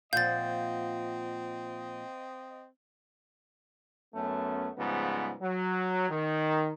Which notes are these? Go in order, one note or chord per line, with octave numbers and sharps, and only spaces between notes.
A#2 F3 C4 D#5 F5 F#5 G6 A6
F#2 A3 B3 C#4
G#2 C#3 F3 G3 B3
F#3
D#3